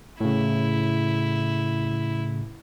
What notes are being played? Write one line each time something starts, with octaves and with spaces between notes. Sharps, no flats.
A2 C#3 E4